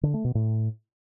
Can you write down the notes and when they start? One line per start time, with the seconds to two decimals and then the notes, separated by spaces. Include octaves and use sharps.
0.03 D3
0.14 A3
0.24 B2
0.35 A2